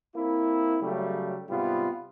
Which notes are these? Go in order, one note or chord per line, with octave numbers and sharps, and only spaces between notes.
A#3 C4 E4
C#3 F#3 G3 A3
G#2 C3 G3 B3 F4